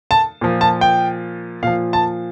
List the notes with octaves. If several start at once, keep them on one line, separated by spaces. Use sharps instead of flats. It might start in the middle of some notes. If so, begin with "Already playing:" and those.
A5
A#2 F3
A5
G5
A#2 F3 F5
A5